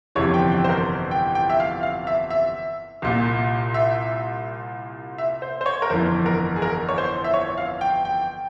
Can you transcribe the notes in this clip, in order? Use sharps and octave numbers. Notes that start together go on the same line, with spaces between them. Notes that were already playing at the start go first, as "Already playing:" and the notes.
G1 F2 C3 E3 C#5
G5
G5
C5
A#4
G5
G5
E5
F5
F5
E5
E5
C2 A#2
E5
E5
C5
C5
C#5
A#4
G1 F2 E3 C5
A#4
G#4
A#4
C#5
C5
E5
C#5
F5
G5
G5